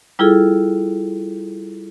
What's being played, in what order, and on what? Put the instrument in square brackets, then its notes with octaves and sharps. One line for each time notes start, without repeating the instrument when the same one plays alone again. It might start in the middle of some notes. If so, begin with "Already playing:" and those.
[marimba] G3 E4 F4 G#4 A4